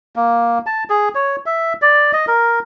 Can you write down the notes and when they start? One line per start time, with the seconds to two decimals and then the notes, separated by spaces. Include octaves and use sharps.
0.16 A#3
0.66 A5
0.90 G#4
1.15 C#5
1.46 E5
1.82 D5
2.13 D#5
2.28 A#4